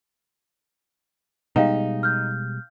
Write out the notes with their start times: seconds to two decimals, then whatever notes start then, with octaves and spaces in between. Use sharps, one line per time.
1.56 B2 G3 G#3 D#4 F5 G5 A#5
2.03 F6 G6